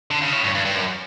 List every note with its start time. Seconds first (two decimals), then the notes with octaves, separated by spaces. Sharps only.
0.11 D3
0.22 C#3
0.33 A2
0.44 G2
0.55 G2
0.65 G2
0.75 F#2